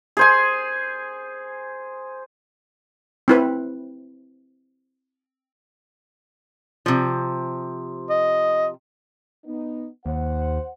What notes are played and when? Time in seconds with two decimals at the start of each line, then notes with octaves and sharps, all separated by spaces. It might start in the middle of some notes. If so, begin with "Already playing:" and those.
0.17 G#4 C5 G#5
3.28 C4 E4 B4
6.86 C3 F3
8.10 D#5
9.45 B3 D#4
10.06 D#2 C5 F#5